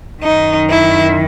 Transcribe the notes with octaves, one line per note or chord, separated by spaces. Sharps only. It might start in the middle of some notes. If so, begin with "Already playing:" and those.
F#2 D#3 D#4
E4